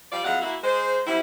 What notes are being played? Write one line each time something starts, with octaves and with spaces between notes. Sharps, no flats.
F3 G3 F4 D5
F2 F#3 G#3 E4 F5 F#5
A#3 E4 F#4
G#3 C5
F#3 G3 C4 E4